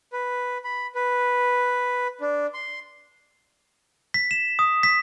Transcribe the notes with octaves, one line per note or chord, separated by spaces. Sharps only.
B4
B5
B4
D4
C6
B6
E7
D#6
B6